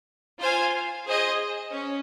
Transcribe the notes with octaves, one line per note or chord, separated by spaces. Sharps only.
F4 C5 F5 G#5
G#4 C5 D#5
C#4